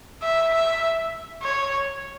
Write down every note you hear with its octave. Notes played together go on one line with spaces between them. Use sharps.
E5
E5
C#5